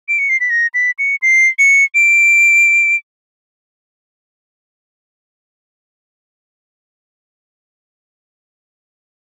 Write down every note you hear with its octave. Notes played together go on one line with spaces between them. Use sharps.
D7
C#7
C7
B6
A#6
B6
C#7
C7
C#7
D7